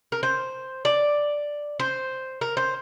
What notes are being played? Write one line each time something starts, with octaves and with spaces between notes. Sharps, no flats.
A#4
C5
D5
C5
A#4
C5